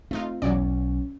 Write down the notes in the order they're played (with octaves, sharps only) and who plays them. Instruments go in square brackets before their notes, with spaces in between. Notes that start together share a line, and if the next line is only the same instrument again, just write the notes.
[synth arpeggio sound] A3 D#4 F4 [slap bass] C4
[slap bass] B1 [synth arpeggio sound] E2 F#3 D5 [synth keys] C#4